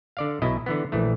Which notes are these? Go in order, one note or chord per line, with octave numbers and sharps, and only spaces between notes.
D3 D5 F5
B1 B2 E4 D#5
D3 E3 B3
A#1 E3 A3